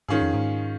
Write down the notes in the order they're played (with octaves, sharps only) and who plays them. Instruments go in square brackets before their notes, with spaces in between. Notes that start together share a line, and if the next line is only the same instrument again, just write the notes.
[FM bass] G#2 [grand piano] D#3 C#4 F4 G#4
[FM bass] F2
G#2